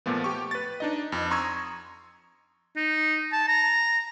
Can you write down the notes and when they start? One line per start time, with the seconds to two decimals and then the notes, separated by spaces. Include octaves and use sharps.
0.06 A#2 F3 A3 B3
0.24 G4 C#6
0.51 B4 A6
0.80 D4 D#4 D#5
1.12 F2
1.31 A#5 C6 C#6 D#6 E6 G#6
2.76 D#4
3.32 A5
3.48 A#5